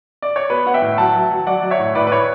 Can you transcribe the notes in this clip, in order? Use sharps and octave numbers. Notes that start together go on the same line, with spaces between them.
D5
C#5
B3 B4
B3 F#5
E5 G5
A2
F#3 F#5 A5
F#3
F#3
F#3 D5 F#5
F#3
C#5 E5
A2
A2 B4 D5
B4
A2 C#5